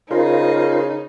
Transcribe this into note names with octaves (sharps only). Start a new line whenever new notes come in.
C#3 D#4 F4 A#4 C5